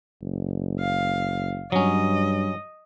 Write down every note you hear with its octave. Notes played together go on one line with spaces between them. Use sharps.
F#1
F5
G2 F#3 C#4 D#5